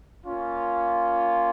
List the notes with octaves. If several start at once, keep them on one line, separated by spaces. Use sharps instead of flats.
A#3 C#4 F4